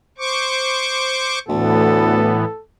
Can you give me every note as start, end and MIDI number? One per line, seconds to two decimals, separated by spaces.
0.18 1.39 72
0.18 1.39 85
0.18 1.39 86
1.48 2.37 38
1.48 2.44 45
1.48 2.44 52
1.48 2.44 59
1.48 2.61 69